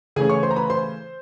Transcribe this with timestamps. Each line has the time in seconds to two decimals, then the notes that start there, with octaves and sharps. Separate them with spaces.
0.16 C#3 E3 A3 C#4 G#4 G#5
0.30 C#5 C#6
0.43 C5 C6
0.51 A#5
0.56 B4 B5
0.70 C5 C6